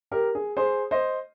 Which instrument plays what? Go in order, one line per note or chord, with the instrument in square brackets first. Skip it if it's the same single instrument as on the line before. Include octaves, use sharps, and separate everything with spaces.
[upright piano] G4 A#4
G#4
G#4 C5
C5 D#5